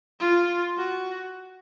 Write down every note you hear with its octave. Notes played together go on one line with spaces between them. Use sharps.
F4
F#4